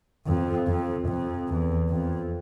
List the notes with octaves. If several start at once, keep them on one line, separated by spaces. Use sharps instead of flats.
F2
F2
F2
E2
F2